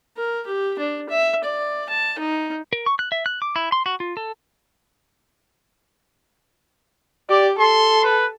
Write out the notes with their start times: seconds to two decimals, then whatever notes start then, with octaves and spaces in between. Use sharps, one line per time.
0.17 A#4
0.46 G4
0.79 D4
1.09 E5
1.44 D5
1.89 A5
2.19 D#4
2.73 A#4
2.86 C#6
2.99 F#6
3.12 E5
3.26 F#6
3.42 D6
3.56 E4
3.72 C6
3.86 F#4
4.00 F4
4.17 A4
7.29 G4 D5
7.59 A4 C6
8.04 B4